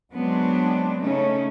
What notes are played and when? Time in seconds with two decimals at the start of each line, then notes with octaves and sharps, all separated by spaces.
0.14 F#3 G#3 B3 C4 D4
1.01 C#3 A3 C#4 D#4